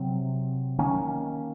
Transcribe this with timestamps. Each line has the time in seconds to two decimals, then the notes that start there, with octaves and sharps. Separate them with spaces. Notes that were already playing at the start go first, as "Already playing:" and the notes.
Already playing: C3 F#3 C4
0.79 D#3 A#3 C#4